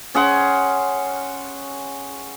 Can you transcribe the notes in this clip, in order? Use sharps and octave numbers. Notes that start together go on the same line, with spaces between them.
C#4 G#4 F#5 C6